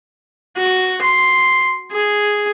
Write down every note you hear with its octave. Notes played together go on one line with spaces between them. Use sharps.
F#4
C6
G#4